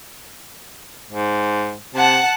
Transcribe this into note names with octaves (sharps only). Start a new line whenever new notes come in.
G#2
C3 F#5 A5